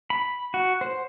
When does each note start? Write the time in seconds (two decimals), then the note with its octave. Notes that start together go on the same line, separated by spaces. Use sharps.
0.10 B5
0.54 F#4
0.81 C5